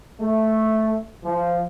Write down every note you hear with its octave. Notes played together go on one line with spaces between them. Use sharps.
A3
F3